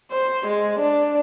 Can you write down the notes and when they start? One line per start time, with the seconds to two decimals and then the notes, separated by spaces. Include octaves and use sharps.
0.12 C5
0.47 G#3
0.80 D4